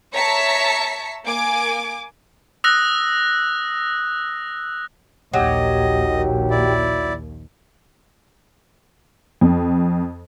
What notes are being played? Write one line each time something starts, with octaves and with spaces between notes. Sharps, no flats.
C#5 E5 A5 A#5 B6 C#7
A#3 G#5 D6 D7
D#6 E6 F#6 A#6
A#1 D#2 F#3 G4 D#5
E4 D5
F2